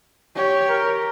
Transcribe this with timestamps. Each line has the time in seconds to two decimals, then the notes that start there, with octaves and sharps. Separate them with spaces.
0.36 G4 C#5
0.69 A#4